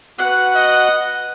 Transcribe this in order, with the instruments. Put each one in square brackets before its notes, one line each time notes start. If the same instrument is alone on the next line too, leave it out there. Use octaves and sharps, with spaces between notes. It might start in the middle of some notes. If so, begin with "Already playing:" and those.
[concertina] F#4 F#6 [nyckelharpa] B4 F#5
[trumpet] D#5